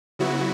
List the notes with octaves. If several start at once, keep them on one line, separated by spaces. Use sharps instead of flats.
C#3 F#3 B3 E4 F#4